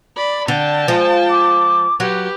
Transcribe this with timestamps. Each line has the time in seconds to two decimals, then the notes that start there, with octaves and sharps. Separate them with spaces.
0.16 D5 B5
0.48 D3 G5 A5
0.88 F3 G#3
1.30 D6
2.00 F#3 G4 B4